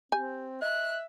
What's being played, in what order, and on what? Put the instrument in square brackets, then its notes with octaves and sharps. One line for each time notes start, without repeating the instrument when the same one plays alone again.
[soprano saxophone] C4 [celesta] G4 G6 [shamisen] G#5
[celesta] D#5 [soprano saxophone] E5 [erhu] F#6